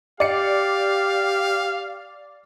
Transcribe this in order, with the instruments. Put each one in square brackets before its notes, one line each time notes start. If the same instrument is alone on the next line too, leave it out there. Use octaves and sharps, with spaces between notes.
[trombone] G4 [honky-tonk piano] D5 C7 C#7 [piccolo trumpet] F5